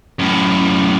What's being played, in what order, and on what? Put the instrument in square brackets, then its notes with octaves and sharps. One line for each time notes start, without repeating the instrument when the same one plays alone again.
[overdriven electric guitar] F#2 A2